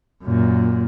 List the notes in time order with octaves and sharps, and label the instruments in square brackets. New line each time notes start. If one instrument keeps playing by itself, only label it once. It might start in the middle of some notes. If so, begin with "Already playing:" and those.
[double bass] F#2 A#2